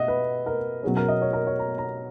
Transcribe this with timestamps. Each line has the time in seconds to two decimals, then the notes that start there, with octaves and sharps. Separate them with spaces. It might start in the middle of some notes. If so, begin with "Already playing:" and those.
Already playing: B2 D#5 E5 F#5
0.08 B4
0.46 A#4
0.83 B2 F#3 C#4 G#4
0.97 A#4
1.08 D#5
1.22 C#5
1.33 A#4
1.47 C#5
1.59 A#5
1.78 A#5